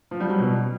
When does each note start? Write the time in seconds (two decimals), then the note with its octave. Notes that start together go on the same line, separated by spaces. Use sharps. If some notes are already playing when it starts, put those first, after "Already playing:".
0.11 F3
0.20 G3
0.29 F#3
0.39 B2